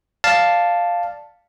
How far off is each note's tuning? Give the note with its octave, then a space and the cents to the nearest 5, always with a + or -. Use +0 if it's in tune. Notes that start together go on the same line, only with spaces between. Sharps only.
D5 +0 F5 +0 A5 +0